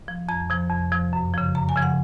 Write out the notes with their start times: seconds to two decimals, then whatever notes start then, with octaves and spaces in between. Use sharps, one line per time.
0.08 F3
0.29 F2 A#5
0.50 C3 F3
0.70 F2
0.92 C3 F3
1.13 F#2
1.34 C#3 F3
1.55 F#2 A#5
1.69 G#5
1.76 C#3 F3
1.82 F#5